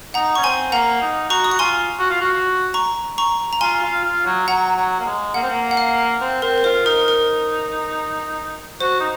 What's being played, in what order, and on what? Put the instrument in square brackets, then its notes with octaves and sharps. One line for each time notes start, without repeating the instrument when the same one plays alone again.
[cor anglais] D#4 [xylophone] F#5 A#5
[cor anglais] C#4 [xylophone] C#6
[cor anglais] C4 [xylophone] G#5 C6
[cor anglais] A#3 [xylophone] F#5 A#5
[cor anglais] D#4
[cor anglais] F#4 [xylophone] A#5 C#6
[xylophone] D#6
[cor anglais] F#4 [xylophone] C#6
[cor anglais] F4 [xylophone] G#5 C6
[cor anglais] F#4
F4
F#4
[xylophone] A#5 C#6
A#5 C#6
A#5
[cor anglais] F4 [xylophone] G#5 C6
[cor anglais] F4
F4
F#3
[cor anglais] F#3 [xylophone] F#5 A#5
[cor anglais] F#3
A#3
G#3
[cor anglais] A#3 [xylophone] F#5
[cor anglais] C4
A#3
[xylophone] F#5
F5
[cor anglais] C4
[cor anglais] C4 [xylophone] A#4
[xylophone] A#4
[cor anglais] F4 [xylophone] C5
[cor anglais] D#4 [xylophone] A#4
[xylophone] A#4
[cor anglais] F#4 [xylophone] C5
[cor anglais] D#4